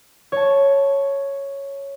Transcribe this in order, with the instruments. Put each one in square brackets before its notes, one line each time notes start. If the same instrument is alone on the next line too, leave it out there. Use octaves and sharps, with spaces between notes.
[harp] C#5 A5